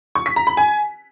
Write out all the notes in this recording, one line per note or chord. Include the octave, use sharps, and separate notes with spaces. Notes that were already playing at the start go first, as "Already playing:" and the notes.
C#6
B6
A#5
B5
G#5